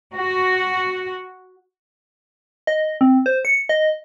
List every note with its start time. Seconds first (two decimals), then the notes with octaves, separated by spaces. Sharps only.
0.15 F#4
2.67 D#5
3.01 C4
3.26 C5
3.45 C#7
3.69 D#5